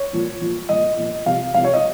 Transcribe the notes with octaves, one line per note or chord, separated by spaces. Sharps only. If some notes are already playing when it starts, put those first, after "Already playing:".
Already playing: C#5
A#2 F3
A#2 F3
A#2 F3 D#5
A#2 F3
C3 F3 F5
C3 F3 F5
C#5
D#5